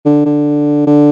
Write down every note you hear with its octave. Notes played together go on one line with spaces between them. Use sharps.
D3
D3
D3